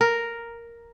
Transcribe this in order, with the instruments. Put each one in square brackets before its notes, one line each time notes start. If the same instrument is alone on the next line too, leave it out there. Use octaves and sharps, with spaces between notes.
[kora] A#4